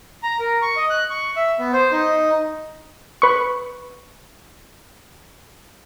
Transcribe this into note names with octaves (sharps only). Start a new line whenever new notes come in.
A#5
A#4
C#6
D#5
F#6
C#6
E5
B3
C5
D#4
B4 C#6